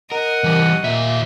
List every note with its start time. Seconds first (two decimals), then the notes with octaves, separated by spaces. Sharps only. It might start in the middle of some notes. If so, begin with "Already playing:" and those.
0.12 A#4 D#5 F#5
0.44 E3 G3
0.84 D#2 A#2 E5